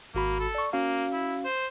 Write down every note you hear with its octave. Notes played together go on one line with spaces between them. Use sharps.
G#1 A#3 F#4 B5
A4
D5 C#6
A#3 C#4 F#4 F5
E4
C5